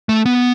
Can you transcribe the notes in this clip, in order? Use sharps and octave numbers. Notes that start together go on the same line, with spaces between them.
A3
B3